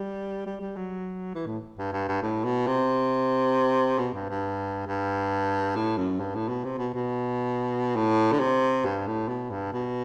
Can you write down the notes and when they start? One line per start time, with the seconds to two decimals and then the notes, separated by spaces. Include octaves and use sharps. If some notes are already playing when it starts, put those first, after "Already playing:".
Already playing: G3
0.46 G3
0.61 G3
0.76 F#3
1.35 E3
1.46 A2
1.78 G2
1.93 G2
2.09 G2
2.22 A2
2.44 B2
2.67 C3
3.99 B2
4.13 G2
4.29 G2
4.87 G2
5.75 A2
5.98 F#2
6.20 G2
6.35 A2
6.48 B2
6.64 C3
6.78 B2
6.94 B2
7.96 A2
8.32 D3
8.40 C3
8.85 G2
9.07 A2
9.28 B2
9.51 G2
9.72 B2